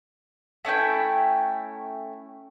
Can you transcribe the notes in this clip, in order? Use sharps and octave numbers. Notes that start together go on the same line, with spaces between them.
A3 C#4 E4 G5